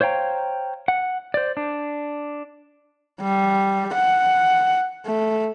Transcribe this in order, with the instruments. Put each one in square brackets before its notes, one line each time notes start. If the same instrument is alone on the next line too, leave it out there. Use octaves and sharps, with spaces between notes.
[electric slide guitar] C5 C#5 F5 G5 A#5
F#5
C5 D5
D4
[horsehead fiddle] G3
F#5
A3